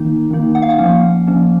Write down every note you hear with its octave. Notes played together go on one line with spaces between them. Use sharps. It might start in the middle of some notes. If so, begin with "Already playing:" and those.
Already playing: D#3 A#3 D#4
D#3 A#3 D#4
F#5
F5
F#5
F3 A#3 C#4
F3 A#3 C#4